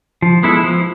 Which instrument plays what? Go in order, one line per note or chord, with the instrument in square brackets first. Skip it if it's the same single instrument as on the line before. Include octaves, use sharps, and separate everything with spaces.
[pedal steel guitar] F3
G#3 B3 E4 A4
F3